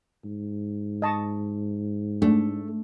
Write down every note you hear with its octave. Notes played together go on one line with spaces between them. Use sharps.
G#2
D#5 A5 C#6
A3 D4